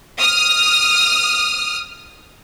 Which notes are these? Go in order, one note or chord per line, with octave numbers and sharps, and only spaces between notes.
D#6 F6